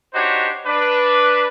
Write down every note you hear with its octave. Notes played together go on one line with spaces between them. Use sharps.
D4 D#4 F#4 G4 C5 C#5
D4 B4